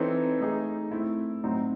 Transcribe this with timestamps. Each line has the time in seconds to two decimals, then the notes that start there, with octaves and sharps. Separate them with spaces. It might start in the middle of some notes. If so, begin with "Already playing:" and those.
Already playing: E3 C4 D#4 A4 C#5
0.40 A3 D#4 G#4
0.91 A3 C4 E4
1.44 A2 F#3 C4 D#4